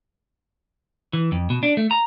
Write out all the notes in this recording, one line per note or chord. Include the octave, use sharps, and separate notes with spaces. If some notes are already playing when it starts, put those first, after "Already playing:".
E3
F2
B2
D4
A3
A#5